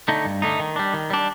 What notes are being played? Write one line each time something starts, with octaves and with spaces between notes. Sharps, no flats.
D3 A3 D#4
G2
D3 A3 D#4
D#3
G3 D4
D#3
G3 D4